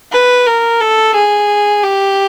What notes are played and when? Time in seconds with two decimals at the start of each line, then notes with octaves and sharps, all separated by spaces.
0.12 B4
0.46 A#4
0.81 A4
1.15 G#4
1.83 G4